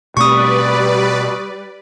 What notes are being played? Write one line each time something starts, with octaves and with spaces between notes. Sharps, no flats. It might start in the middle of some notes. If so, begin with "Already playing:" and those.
B2 G3 A3 C4 B4 D5 C#6 D#6